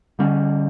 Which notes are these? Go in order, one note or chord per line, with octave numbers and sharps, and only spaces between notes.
D3 G3 C#4